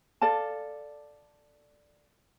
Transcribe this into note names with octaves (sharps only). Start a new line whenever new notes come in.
A4 D5 F5 A5